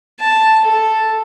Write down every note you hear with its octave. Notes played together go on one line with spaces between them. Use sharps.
A5
A4